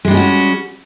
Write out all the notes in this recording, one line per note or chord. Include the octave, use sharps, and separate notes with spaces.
G3 G#3 C#4 D4 F#4